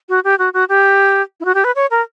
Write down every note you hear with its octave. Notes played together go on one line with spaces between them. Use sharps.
F#4
G4
F#4
F#4
G4
E4
F#4
G4
B4
C#5
A#4